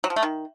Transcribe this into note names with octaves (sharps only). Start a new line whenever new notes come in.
F#3
F3
A3
D#3